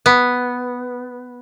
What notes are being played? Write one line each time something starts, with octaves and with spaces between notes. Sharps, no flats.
B3